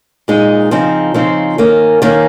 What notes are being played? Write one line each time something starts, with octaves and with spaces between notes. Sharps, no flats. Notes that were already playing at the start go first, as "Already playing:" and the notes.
A#2 G#3 D#4
C#3 F3 C4 D#4
C#3 F3 C4 D#4
D#3 A#3 C#4
D#3 A#3 C#4